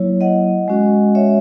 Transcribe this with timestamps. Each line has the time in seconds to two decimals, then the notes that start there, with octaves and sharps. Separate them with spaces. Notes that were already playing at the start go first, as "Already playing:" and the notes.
Already playing: F#3 A#3 E4 C#5
0.21 D#5 F#5
0.68 G#3 C#4 F#4
1.15 C#5 E5